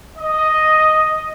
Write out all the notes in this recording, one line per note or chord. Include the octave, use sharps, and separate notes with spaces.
D#5